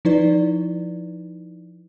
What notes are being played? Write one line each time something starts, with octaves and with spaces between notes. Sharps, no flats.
F3 D#4 E4 B4 D5